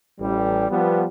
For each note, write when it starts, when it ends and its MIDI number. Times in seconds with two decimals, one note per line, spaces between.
0.20 0.67 33
0.20 0.67 55
0.70 1.05 53
0.70 1.05 55
0.70 1.05 59